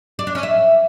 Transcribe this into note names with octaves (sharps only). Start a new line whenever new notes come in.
D5
D4
C#4
E5